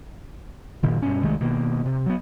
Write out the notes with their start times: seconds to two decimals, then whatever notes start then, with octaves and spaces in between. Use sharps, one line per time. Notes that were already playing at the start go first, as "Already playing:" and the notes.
0.83 F#1 A#2 D#3
1.02 G2 B2 C#4
1.22 C2 D#3 G#3 A3
1.40 B2 D#3 A#3
1.85 C3
2.06 F#3 G3 B3